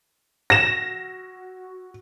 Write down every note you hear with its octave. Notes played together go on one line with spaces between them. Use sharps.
F#4 A#6 E7